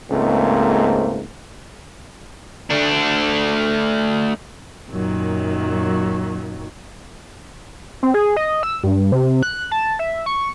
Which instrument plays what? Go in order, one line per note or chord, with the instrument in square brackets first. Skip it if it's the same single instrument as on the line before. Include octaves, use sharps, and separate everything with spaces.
[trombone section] C#2 G#2 A3 A#3 C4
[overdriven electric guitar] A3 D4
[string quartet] F#2 A#2 D#3 F#3
[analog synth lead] C4
G#4
D#5
E6
G2
C3
F#6
A5
E5
C#6